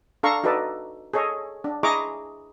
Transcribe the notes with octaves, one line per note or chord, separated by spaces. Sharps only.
D4 A4 F5 A#5 C#6
D#4 F#4 A4 B4 D5
G#4 A4 C#5 D#5
D4
E4 G#4 D#5 A#5 C#6 D6